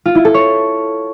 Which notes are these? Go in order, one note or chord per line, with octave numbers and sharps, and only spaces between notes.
F4
E4
A4
C#5